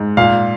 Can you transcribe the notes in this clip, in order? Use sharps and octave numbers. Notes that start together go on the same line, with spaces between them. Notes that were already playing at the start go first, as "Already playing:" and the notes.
Already playing: G#2
A#2 F5